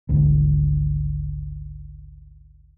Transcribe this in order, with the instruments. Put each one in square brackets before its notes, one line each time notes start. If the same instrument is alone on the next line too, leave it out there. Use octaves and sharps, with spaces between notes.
[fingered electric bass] G#1 D2